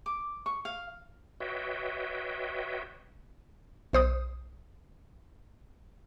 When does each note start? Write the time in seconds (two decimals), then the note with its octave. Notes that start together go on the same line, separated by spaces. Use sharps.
0.06 D6
0.46 C#6
0.65 F5
1.40 F#4 B4 C#5 D#5 E5 G5
3.93 B1 C5 D#6